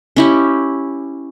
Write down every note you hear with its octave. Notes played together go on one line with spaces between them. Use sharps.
C#4 E4 G4